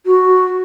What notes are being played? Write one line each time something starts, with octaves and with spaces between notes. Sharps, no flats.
F#4